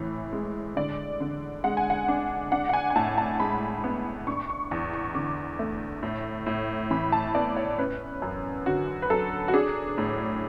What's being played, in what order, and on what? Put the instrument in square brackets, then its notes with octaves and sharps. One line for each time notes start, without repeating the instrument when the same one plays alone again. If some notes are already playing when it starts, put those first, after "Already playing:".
Already playing: [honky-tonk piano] A2 E3
G#3
D3 D5
D3
G#3 F#5
G#5
F#5
D4
D4 F#5
F#5
G#5
G#5
A2 A5
A5
G#3 B5
B3
D4 C#6
C#6
E2 C#6
C#6
D3 D6
A3
A2
A2
E3 B5
A5
B3 D5
C#5
C#4 B4
F#2
D3 F#4
B4
F#3 A4
F#4
D4 G#4
A2